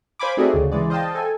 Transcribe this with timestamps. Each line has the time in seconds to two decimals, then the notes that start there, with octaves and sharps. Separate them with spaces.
0.19 C5 F5 G#5 B5 D6
0.37 A3 C4 D#4 F#4 G#4 D5
0.54 D2 C#3
0.72 E3 G#3 D5
0.90 C5 D#5 F5 G5 A5
1.15 A4 G#5